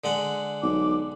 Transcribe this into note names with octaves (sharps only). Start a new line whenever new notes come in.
D3 G#3 F#5
B1 D6